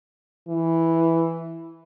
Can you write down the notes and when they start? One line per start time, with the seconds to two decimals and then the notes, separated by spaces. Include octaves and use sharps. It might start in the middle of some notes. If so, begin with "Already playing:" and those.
0.48 E3